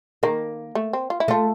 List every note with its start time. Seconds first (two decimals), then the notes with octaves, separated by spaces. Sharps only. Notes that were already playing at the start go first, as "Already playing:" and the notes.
0.23 D#3 A#3
0.75 A3
0.93 C4
1.10 F4
1.20 E4
1.28 A3 F4